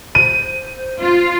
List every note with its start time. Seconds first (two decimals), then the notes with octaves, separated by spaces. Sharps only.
0.15 C5 D#7
0.99 F4